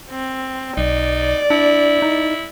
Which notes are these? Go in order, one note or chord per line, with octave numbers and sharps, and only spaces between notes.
C4
B1 D#4 D5
D4 E4
D#4